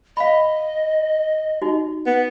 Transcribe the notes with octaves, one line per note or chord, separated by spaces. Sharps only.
D#5 F5 B5
D#4 F#4
B3